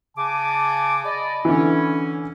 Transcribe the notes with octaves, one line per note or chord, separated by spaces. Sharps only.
C#3 G#5 A5 D6
D5 D#5 B5
D3 E3 C#4